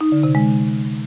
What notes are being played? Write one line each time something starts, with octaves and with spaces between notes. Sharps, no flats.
D#4
D3
C3
G#3